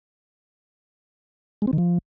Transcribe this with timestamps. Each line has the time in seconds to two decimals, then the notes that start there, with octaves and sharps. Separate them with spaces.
1.62 G#3
1.67 C4
1.73 D#3
1.78 F3